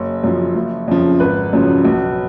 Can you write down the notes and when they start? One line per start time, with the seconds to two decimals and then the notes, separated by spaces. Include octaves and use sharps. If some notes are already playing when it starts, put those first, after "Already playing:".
Already playing: F#1 C#5
0.24 F#2 F3
0.55 F#1
0.88 F2 C#3 F3
1.20 G#1 B4
1.53 F#2 C#3 F3
1.85 B1